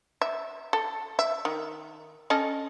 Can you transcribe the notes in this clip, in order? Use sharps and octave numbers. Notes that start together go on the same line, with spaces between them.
E5
A4
E5
D#3
C#4 A4 D#5